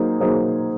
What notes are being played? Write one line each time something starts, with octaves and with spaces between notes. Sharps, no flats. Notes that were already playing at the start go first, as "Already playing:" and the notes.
Already playing: F#3 A#3 D#4 G#4 C5
F#3 A#3 D#4 G#4 C5